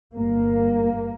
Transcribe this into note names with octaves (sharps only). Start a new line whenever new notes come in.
G1 G2 A#3